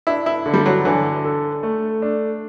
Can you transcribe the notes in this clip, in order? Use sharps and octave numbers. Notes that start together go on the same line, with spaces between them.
D4 E4
E4
D3
G3
F#3
D3 E3
A4
A3
D4